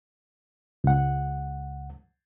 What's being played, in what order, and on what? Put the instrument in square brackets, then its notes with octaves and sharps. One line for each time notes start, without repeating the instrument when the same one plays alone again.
[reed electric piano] C#2 F#5